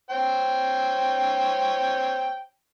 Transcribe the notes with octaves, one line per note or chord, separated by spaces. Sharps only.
C5 C#5 G5